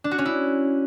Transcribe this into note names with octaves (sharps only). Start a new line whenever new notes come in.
D4
F#4
C#4
E4